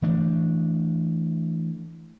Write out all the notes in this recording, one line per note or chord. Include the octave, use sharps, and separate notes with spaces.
E3 A3 D4